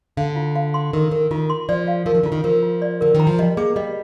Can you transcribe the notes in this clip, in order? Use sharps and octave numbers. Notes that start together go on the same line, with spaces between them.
D3 F5
F4
F5
C6
D#3 A#4
D#3 A#4
D#3 F4
C6
F3 D5
F5
F3 A#4
D#3
D3 F4
D#3
F3 A#4
F4
D5
D3 A#4
D#3
A#5
F3
G3 D#5
A#3 G#4
G3 D#5